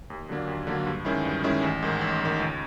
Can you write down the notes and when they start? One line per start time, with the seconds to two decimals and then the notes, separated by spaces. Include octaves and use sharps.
0.10 D#2
0.29 D3 F#3 A#3 D4
0.47 D#2
0.67 D3 F#3 A#3 D4
0.86 G2
1.05 D#3 G#3 C#4 E4
1.25 G2
1.44 D#3 G#3 C#4 E4
1.62 A1
1.83 G#2 D#3
2.01 A1
2.21 G#2 D#3
2.40 C#2